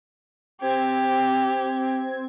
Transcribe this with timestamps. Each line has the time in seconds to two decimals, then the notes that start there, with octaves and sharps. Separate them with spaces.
0.61 C4 G4 G#6